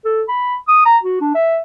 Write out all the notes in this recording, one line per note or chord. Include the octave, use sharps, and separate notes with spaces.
A4
B5
D#6
A#5
F#4
D4
E5